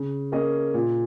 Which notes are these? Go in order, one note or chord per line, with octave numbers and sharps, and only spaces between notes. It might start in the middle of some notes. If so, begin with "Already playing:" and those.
Already playing: C#3
A#3 C#4 G#4 D#5
A#2